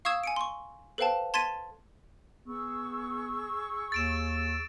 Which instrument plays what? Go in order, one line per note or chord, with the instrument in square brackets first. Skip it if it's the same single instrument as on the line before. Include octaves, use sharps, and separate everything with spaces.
[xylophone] F5 C#6 D#6 E6 G#6 E7
G#5 C#7 D7
C6 C#6
A4 B4 C5 F5 G5 A5
A5 C6 G#6 A6 B6 D#7
[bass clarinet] B3 [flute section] G#4 C#6 E6
[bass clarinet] D#2 [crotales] A6 D7 E7